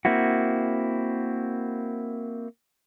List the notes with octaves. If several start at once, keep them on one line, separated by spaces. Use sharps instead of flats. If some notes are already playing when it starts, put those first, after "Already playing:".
A#3 C4 E4 F#4